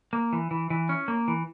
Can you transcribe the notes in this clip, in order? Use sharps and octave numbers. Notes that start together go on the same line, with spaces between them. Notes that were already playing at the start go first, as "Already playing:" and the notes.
A#3
E3
E3
E3
C#4
A#3
E3